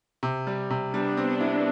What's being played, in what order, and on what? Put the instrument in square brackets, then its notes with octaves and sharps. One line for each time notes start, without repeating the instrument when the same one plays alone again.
[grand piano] C3
G3
C3
[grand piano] G3 [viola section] B3 D4
[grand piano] C4
E4